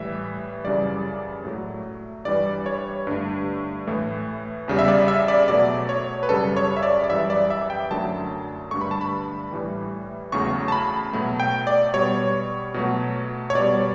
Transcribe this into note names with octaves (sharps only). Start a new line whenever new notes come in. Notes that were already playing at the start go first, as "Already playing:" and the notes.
Already playing: A2 E3 G3 E5
F#2 C#3 E3 G3 D5
A2 F#3 A3
G2 E3 G3 D5
C#5
G2 D3 A3
A2 E3 A3
E2 C#3 G3
E5
D5
E5
D5
B2 F#3 A3 D5
C#5
B4
F#2 C#3 G3 A4
C#5
E5
D5
D5
F#2 E3 G3 E5
D5
E5
G5
F#2 D3 F#3 A3 A5
G2 D3 A3 C#6
B5
A5
B5
A2 E3 G3
E2 C#3 F#3 A3 C#6
A5
B5
B2 F#3 A3
G5
D5
B2 G3 C#5
B2 F#3 A3
C#5
B2 G3 D5